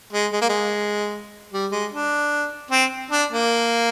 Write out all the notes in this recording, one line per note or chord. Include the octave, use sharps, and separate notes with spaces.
G#3
G#3
A#3
G#3
G3
G#3
D4
C4
D4
A#3